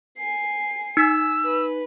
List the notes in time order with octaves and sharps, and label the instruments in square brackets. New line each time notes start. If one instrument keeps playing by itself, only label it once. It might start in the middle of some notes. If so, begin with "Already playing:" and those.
[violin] G#5 C7
[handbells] D#4 G#6 B6 [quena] E6
[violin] B4